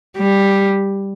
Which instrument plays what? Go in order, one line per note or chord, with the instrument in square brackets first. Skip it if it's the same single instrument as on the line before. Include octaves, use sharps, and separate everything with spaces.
[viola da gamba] G3